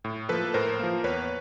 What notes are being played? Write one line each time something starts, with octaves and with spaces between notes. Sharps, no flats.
A2
F3 A#3 A4 B4
A2 A#4 C5
F3 A#3
E2 B4 C#5